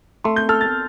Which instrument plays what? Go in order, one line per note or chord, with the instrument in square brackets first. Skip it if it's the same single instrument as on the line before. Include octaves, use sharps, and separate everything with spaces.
[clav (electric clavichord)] A3 [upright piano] C6
[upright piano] G6
[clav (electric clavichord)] A4 [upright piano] F6
[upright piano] A6